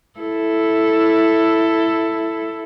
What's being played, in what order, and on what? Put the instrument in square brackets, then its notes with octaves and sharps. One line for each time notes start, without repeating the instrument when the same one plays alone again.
[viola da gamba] E4 A4